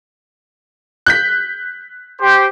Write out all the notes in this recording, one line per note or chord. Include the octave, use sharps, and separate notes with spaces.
F#6 G6 B6
G4 C5